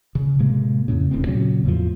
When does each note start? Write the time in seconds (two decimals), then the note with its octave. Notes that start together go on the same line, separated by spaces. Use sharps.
0.15 C#3
0.39 A2 C3 G#3 A#3
0.88 F2 A2 C#3
1.11 D#1 D2 A2 C4
1.27 A#2 C#3 F#3
1.64 E2 A2 F3